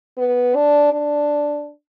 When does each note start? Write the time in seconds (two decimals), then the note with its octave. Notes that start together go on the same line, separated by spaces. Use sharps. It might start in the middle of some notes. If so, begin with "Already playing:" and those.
0.18 B3
0.55 D4
0.93 D4